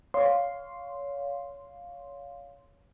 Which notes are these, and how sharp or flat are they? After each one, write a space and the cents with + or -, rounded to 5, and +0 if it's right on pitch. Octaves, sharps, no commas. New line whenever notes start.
C#5 +25 F5 +5 C6 +0